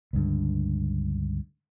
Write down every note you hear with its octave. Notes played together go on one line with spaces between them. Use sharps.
C#2 G2 D3